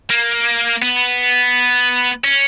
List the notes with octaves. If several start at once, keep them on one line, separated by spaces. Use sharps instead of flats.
A#3
B3
C#4